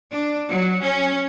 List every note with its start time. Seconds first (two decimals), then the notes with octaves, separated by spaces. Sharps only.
0.12 D4
0.49 F#3
0.83 C#4